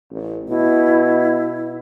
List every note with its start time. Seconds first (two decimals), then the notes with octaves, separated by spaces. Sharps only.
0.11 A1
0.48 B2 E4